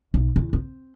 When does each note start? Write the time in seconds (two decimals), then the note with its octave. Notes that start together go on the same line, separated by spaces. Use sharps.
0.14 B1
0.36 E2
0.53 C4